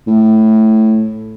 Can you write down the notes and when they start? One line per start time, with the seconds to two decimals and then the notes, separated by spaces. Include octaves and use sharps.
0.07 A2